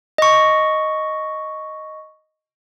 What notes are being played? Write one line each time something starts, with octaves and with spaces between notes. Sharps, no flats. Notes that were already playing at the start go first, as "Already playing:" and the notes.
D#5 C#6